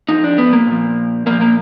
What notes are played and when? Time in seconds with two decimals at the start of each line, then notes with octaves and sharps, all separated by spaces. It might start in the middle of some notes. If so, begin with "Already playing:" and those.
0.09 F2 F3 D#4
0.24 D4
0.38 B3
0.53 A#3
0.67 A#2 F3
1.26 A#2 F3 A#3
1.41 A#3